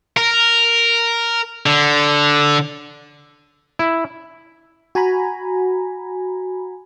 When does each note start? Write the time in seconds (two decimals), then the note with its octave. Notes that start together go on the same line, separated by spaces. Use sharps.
0.17 A#4
1.66 D3
3.79 E4
4.95 F#4 G#5 A#5 B5